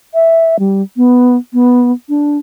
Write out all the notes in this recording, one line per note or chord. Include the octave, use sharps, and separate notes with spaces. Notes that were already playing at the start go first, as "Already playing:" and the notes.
E5
G3
B3
B3
D4